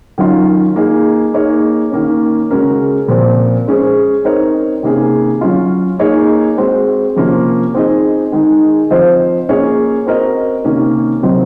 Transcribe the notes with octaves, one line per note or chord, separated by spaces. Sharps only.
D#3 F#3 C#4 F4
A#3 D#4 G#4
A#3 D#4 G#4 C#5
D#3 A#3 C#4
C#3 G#3 C#4 F#4 A#4
A#2 F3 C4
G#3 C#4 G#4 C5
C4 D#4 A#4 C#5
C3 D#3 A#3 C#4 G#4
F#3 C#4 F4
A#3 D#4 G#4 C#5
G#3 C4 F#4
C3 F3 A#3 C#4 F4
C4 D#4 G#4 D#5
D#3 G#3 D#4 G#4
F3 C4 F4 C5 D#5
A#3 C#4 G#4 C#5
C4 F#4 A#4 D#5
C3 D#3 A#3 C#4
C3 D#3 F#3 C4 D#4